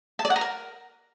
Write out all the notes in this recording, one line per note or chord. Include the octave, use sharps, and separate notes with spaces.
A5
D5
F#5
A#5
A#4